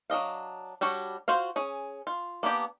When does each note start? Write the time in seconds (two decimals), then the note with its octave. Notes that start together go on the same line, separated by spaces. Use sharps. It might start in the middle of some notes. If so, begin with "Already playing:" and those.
0.10 F#3 D4 D#5 F5
0.81 G3 D4 F#4 C#5
1.28 F4 F#4 C5 F5
1.56 C#4 G#4
2.07 F4
2.43 A#3 B3 D4 G4 D5